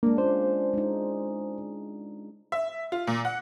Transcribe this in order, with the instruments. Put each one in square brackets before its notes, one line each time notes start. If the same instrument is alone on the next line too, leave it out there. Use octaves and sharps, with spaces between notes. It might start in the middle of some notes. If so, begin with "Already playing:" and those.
[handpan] G#3 D4 [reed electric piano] A#3
[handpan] C#4 F4 [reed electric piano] C5
[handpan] G#3 D#4
[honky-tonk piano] E5
F4
A#2
F#5